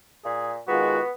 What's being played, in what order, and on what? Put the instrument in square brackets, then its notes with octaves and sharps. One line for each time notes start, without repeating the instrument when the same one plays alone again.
[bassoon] A#2 [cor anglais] G#4
[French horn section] D#3 G#3 F4 [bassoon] B3 [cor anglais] F#4